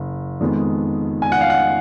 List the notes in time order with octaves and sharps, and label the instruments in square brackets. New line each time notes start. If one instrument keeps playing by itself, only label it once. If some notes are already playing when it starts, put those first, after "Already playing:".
Already playing: [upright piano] F#1
F2 D#3 G#3 B3
G#5
F#5
F5
F#5